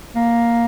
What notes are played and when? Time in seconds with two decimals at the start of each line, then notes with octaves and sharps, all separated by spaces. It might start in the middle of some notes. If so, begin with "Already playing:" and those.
0.16 A#3